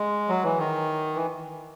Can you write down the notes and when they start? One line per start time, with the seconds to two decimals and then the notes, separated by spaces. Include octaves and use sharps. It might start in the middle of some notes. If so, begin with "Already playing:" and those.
Already playing: G#3
0.29 F#3
0.43 E3
0.58 D#3
1.15 E3